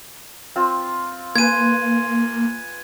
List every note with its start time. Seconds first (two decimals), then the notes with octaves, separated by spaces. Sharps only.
0.56 C4 F4
1.36 A#3 B4 G#5 C6 G#6 D#7